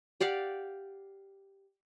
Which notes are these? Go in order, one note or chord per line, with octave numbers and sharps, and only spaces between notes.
G4 D5 F5 F#5